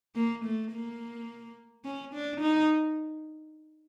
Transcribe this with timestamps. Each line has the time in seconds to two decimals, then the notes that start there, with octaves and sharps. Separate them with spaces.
0.15 A#3
0.45 A3
0.72 A#3
1.85 C#4
2.14 D4
2.41 D#4